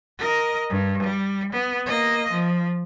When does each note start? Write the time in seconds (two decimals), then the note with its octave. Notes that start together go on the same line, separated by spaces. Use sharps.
0.19 A#4 D#5
0.70 G2
1.02 G3
1.52 B3
1.86 A#3 D#5
2.31 F3